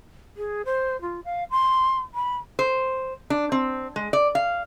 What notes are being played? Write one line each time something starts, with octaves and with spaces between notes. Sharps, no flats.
G#4
C5
F4
F5
C6
B5
C5
D4
C4
G#3
D5
F5